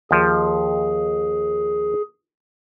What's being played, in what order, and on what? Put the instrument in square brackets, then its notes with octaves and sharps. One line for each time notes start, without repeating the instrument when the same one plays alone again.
[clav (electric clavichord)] D#2 F3 [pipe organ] G#4